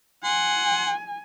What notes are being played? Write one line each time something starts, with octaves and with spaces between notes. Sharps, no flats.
F#5 G#5 C6